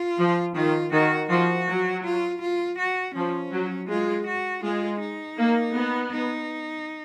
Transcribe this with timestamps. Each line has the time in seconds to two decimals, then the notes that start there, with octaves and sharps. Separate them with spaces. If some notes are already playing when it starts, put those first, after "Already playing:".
Already playing: F4
0.19 F3
0.55 D#3 F4
0.93 D#3 F#4
1.30 F3 F#4
1.68 F#3
2.04 F4
2.41 F4
2.78 F#4
3.15 F3 C#4
3.53 F#3
3.89 G#3 F4
4.27 F#4
4.64 G#3 F4
5.01 D#4
5.38 A#3
5.75 B3
6.11 D#4